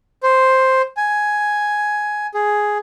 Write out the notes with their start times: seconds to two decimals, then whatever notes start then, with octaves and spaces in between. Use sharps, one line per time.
0.23 C5
0.97 G#5
2.34 G#4